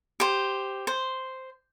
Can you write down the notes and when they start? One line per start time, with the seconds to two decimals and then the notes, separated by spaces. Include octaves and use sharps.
0.20 G4 C5
0.87 C5